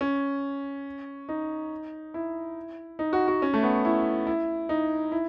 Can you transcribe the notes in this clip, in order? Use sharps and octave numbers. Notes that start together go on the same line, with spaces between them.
C#4
D#4
E4
D#4
F#4
F#4
C#4
A3
B3
E4
E4
D#4
E4